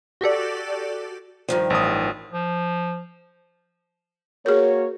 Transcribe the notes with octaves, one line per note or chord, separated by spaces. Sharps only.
F#4 G4 A4 D5
G2 D#3 F3
A1 D#6
F3
A#3 F#4 G#4 A#4 C#5